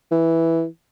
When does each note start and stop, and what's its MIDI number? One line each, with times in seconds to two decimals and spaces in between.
0.11 0.65 52